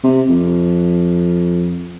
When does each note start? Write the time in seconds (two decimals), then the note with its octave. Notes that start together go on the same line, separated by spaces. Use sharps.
0.04 C3
0.29 F2